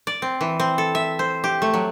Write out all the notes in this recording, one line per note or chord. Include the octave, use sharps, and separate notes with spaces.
D5
C4
E3
C4
A4
E5
C5
G4
A3
F#3